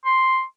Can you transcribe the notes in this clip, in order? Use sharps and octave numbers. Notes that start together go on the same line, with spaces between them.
C6